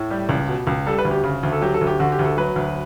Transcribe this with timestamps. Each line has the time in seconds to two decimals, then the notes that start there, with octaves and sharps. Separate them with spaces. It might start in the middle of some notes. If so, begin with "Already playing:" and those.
Already playing: A2
0.10 G3 G4
0.29 C#2
0.48 B2
0.67 C#2
0.86 G3 A4
0.98 B4
1.05 D2
1.11 G4
1.24 C#3
1.43 D2
1.52 A4
1.61 F#3 G4
1.74 A4
1.81 D2
1.87 G4
2.00 D3 F#4
2.12 G4
2.19 D2
2.25 A4
2.37 F#3 B4
2.56 D2